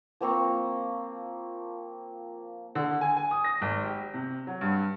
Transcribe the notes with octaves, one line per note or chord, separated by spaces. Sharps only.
F3 A#3 C4 C#6
D3
G#5
G#5
D#6
A#6
G#1
G4
C3
F#3
G2